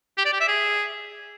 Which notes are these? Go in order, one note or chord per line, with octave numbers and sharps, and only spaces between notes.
G4
D5
G4
E5
G#4